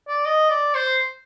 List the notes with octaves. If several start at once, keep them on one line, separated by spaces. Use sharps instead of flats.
D5
D#5
D5
C5